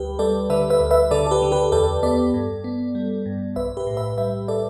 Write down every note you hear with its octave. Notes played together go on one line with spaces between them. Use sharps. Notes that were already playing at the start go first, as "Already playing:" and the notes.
Already playing: D2 G3 G4 B4
G3 A4 D5
D3 B4 E5
B4 E5
D2
B4 E5
D3 A4 D5
A4
G4 B4
D3
G4 B4
E2 A4 D5
B3 A4 D5
G2
B3
G3
G2
B1 B4 E5
G4 B4
A2
B4 E5
G3 B4 E5
A4 D5